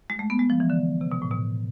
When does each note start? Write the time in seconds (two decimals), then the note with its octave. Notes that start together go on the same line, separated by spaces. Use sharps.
0.10 G#3
0.19 A3
0.30 B3
0.39 G#3
0.50 F3
0.60 E3
0.70 D3
1.01 C3
1.12 B2
1.22 A2
1.31 B2